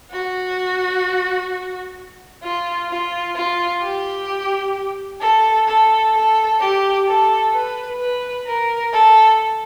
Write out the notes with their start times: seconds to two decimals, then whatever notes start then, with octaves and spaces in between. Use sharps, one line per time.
0.12 F#4
2.43 F4
2.90 F4
3.36 F4
3.83 G4
5.21 A4
5.68 A4
6.15 A4
6.60 G4
7.08 A4
7.53 B4
8.00 B4
8.47 A#4
8.93 A4